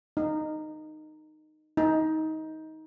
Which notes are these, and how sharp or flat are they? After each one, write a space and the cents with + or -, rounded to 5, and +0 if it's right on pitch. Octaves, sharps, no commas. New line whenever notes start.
D#4 -15
D#4 +20